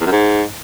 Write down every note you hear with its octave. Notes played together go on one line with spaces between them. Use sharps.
E2
F#2
G#2